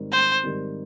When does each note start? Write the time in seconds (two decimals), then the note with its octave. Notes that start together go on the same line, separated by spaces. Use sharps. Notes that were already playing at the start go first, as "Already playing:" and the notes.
Already playing: G#2 D#3 G3 C4
0.12 C5
0.43 G#2 D#3 G3 C4